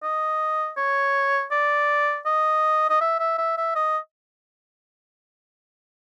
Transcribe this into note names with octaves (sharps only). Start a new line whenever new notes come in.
D#5
C#5
D5
D#5
D#5
E5
E5
E5
E5
D#5